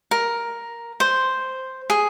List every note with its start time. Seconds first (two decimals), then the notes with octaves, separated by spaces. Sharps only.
0.11 A#4
1.00 C5
1.90 G#4